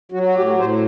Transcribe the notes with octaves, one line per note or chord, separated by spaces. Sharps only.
F#3 F#4
F#4
A2 G4
A2 C5